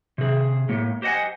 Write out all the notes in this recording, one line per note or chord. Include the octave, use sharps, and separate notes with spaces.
C3 G#4
A2 A#3
G4 C5 D#5 F#5 G#5